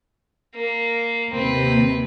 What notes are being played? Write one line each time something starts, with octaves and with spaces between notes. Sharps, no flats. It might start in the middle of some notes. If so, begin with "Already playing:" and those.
A#3
D#2 C3 C4 B4